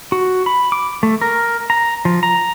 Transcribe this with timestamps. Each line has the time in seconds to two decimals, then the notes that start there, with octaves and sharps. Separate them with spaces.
0.12 F#4
0.46 B5
0.72 D6
1.03 A3
1.21 A#4
1.70 A#5
2.05 F3
2.23 A#5